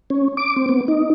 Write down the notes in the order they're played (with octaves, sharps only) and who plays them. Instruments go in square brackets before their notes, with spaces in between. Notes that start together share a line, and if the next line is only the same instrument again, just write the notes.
[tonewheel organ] C#4
D6
C4
B3
D#4